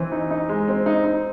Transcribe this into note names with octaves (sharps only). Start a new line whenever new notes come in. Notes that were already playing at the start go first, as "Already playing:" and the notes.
Already playing: E3 C4
D#4
D#4
G#3
C4
D#4
D#4